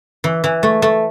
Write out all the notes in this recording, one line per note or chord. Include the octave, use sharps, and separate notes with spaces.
E3
E3
A3
A3